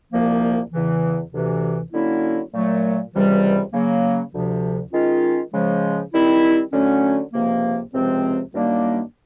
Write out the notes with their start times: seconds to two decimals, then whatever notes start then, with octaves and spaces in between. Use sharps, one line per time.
0.13 C2 A#2 F3 A#3
0.72 E2 C#3 E3
1.33 D2 C3 E3
1.92 D3 F#3 A#3 C#4 E4
2.53 A#2 F#3 A3
3.13 C#2 C3 E3 G3
3.73 C#3 F#3 A#3
4.33 D2 C3 F3
4.93 D#3 G#3 C#4 F4
5.52 C#3 F3 G#3
6.13 D#3 G3 C4 E4
6.73 D3 F#3 A3 C#4
7.33 C#2 C3 F3 A#3
7.93 C#2 C3 F3 G#3 C4
8.52 F#2 D#3 G3 A#3 D4